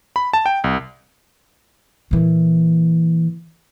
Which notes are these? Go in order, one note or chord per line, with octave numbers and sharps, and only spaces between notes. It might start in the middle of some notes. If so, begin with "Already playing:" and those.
B5
A5
G5
C2
A#2 E3